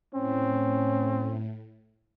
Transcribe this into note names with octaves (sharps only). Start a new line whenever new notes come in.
A2 C4 C#4